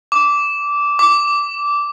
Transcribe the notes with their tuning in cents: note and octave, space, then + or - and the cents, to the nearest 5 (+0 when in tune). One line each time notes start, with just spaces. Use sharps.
D6 -15
D6 -10